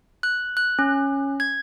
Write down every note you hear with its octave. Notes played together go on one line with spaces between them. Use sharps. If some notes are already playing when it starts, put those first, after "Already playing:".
F#6
F#6
C#4
G#6